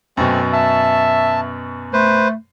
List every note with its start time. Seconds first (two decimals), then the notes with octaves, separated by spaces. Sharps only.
0.17 F#2 B2 A3 C4
0.53 E5 A5
1.93 A3 B4 C5